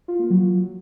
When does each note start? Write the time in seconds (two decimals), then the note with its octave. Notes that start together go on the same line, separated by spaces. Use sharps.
0.08 F4
0.19 A#3
0.30 F#3